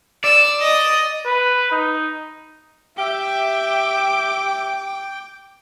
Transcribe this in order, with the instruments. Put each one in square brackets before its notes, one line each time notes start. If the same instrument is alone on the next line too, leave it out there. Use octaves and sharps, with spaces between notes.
[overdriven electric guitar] D5 [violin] E6 E7
[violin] D#5 D#6
[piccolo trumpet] B4
D#4
[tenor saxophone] G4 [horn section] E5 [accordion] G5 [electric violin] D6